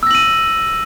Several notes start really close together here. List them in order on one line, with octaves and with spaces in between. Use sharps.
E6 A#6 F#7 D#7